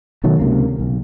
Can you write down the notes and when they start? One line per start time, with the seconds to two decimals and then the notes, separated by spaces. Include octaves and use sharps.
0.24 B2 D#3 F#3 A3
0.39 C#2 C3 A#3
0.79 B1